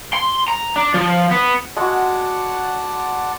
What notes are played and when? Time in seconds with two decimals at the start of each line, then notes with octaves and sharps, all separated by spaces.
0.14 C6
0.48 A#5
0.76 D4
0.94 F3
1.31 B3
1.77 G#3 F#4 D5 F#5 A5